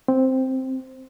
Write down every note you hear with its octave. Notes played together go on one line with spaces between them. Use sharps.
C4